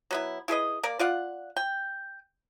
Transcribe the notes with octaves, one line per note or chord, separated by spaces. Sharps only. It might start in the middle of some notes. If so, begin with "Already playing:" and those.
F#3 B3 E4
E4 G#4 B4 D#5
A#3 A#4 D5
F4 D5 F5 F#5
G5